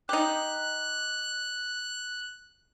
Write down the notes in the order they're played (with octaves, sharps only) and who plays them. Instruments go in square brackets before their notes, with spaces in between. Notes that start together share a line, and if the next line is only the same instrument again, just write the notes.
[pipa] D#4 G4 [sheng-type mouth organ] F#6